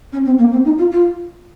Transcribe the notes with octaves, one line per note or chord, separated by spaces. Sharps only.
C#4
C4
A#3
C4
D#4
F4
F4